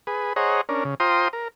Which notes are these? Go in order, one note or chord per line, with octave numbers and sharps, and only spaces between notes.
G#4 B4
G#4 C5 C#5 D#5 F#5 A#5
C#4 D4 A#4
C#3
F4 C5 G5 A#5 C6 D#6
A#4